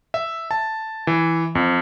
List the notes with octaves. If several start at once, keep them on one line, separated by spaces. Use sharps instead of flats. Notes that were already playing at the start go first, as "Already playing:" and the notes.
E5
A5
E3
F2